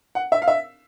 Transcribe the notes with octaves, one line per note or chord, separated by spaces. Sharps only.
F#5
E5
F5
E5